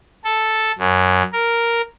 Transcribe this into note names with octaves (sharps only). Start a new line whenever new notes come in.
A4
F#2
A#4